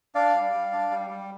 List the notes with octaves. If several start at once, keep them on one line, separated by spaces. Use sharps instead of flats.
D4 D5 F5
G3
G3
D4
G3
G3